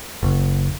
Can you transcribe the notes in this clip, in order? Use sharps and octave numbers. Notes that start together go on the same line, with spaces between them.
F#1